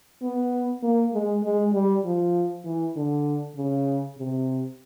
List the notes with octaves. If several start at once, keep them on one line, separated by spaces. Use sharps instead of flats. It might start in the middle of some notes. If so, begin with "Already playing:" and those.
B3
A#3
G#3
G#3
G3
F3
E3
D3
C#3
C3